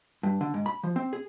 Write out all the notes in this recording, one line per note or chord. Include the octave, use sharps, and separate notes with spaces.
G2
D3
G#2
B5
F3
C4
G#4